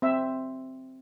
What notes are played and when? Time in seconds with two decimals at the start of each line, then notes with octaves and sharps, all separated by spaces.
0.02 C4 E5